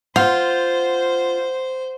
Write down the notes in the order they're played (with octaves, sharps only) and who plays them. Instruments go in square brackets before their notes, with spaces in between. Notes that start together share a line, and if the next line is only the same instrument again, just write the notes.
[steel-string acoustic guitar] F4 [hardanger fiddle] C5 [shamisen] F5 [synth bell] F#5 G6